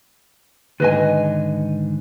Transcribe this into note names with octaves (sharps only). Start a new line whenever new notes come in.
G#2 D3 D#3 B4 D#5 G#5